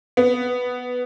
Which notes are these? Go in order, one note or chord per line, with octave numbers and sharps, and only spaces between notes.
B3